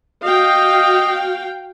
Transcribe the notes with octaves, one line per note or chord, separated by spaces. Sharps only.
F#4 D#5 F5 G5